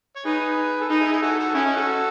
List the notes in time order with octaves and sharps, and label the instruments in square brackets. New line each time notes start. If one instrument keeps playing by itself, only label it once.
[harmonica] C#5
[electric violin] D#4 [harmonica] G#4 B4
[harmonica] A4
[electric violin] D#4 [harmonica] G#4 B4
[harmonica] E4 G#4
E4 G#4
F#4 A4
F#4 A4
[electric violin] C#4 [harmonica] E4 G#4
[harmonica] D#4 F#4
F#4 A4